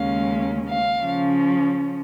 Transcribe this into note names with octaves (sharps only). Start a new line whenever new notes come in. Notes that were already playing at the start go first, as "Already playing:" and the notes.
Already playing: D#2 C#3 G#3 C#4 F5
F5
C#3 F3 C#4